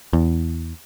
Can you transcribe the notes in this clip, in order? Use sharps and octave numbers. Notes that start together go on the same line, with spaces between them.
E2